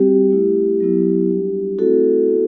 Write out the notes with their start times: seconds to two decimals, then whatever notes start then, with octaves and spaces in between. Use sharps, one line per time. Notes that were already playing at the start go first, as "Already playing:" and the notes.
Already playing: G3 C4 F#4 G4
0.31 A3 E4
0.80 F#3 B3 E4
1.30 G3 D4 F#4
1.79 A3 C4 E4 F#4 A4
2.28 B3 E4